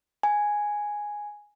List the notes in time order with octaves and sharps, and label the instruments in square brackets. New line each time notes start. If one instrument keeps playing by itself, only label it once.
[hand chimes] G#5